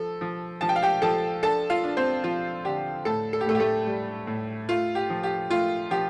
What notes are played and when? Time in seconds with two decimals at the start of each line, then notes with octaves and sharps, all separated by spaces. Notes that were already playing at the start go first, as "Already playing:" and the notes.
Already playing: F3 A4
0.21 F3
0.61 F3 A5
0.69 G5
0.76 F5
0.83 G4 G5
1.02 F3 A4 A5
1.43 D4 A4 A5
1.70 F4 F5
1.83 D4
1.97 C4 C5
2.23 F3 F4
2.65 D3 G4
3.05 A2 A4 A5
3.33 A4
3.41 G4
3.46 A2 A3 A4
3.55 G4
3.60 A3 A4
3.86 G3
4.27 A2
4.69 A3 F4
4.95 G4
5.10 F3
5.23 G4
5.50 A3 F4
5.90 F3 G4